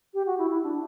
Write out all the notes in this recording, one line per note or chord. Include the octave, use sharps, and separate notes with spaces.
G4
F#4
E4
E4
D4